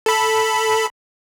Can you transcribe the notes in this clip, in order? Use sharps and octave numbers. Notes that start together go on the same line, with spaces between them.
A4 B5